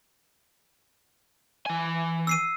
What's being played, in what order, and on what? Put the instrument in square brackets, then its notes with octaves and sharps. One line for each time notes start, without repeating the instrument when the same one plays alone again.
[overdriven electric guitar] E3 G#5
[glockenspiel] E6 C7 D#7